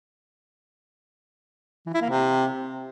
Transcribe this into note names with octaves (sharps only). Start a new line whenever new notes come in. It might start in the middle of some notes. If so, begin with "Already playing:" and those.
E3
E4
A#3
C3